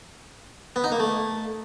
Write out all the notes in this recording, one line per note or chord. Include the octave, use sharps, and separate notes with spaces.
B3
D#4
A#3
A3